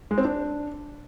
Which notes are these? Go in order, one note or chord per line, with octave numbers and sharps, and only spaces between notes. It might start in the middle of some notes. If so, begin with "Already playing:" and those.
G#3
C4
D4